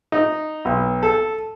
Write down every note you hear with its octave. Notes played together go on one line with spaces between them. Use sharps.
D#4
B1
A4